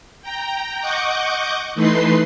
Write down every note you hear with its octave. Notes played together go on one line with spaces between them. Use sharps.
G5 A#5
D#5 F#5 C#6 D6 G6
E3 A3 D#4 B4 C6 C7